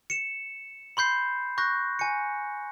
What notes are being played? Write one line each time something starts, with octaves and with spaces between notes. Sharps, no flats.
C#7 E7
B5 C6 G6 C7
C#6 F#6 G6 A#6
G#5 C#7